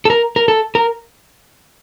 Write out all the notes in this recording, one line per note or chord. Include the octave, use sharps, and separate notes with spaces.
A4
A#4
A#4
A4
A#4